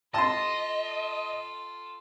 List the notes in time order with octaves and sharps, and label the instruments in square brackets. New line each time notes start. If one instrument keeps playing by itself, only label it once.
[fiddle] F4 A4 [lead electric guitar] D#5 [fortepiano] A5 C6